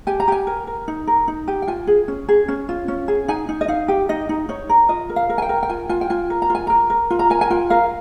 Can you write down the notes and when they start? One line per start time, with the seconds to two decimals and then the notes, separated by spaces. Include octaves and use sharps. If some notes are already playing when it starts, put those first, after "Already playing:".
0.07 G4 G#5
0.20 A#5
0.28 G4 G#5
0.47 A#4
0.67 A#4
0.88 D#4
1.07 A#4
1.28 D#4
1.48 G4
1.62 G5
1.68 F4 G#5
1.87 G#4
2.08 C#4
2.29 G#4
2.48 C#4
2.69 F4
2.88 C#4
3.08 G#4
3.28 D#4 G#5
3.49 D#4
3.61 D#5
3.68 D#4 F5
3.88 G4
4.09 D#4 D#5
4.29 D#4
4.49 D#4 C#5
4.69 A#4
4.89 F4 D#5
5.09 A#4
5.16 F5
5.30 A#4
5.38 G#5
5.42 G5
5.49 A#4
5.63 G5
5.69 F4 G#5
5.89 F4 G#5
6.01 G5
6.10 F4 G#5
6.30 A#4
6.42 A#5
6.50 F4 G#5
6.67 A#4 A#5
6.90 A#4
7.10 F4
7.19 A#5
7.30 A#4 G#5
7.41 G#5
7.50 F4 G5
7.70 A#4 F5